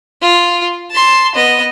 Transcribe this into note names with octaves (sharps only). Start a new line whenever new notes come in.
F4
A5 C6
B3 D#5